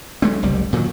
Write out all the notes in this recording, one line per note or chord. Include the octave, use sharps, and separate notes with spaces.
F#3 G#3 A3 C4
F#1 C2 F#2 G3
A#2 D#3 F3 F#3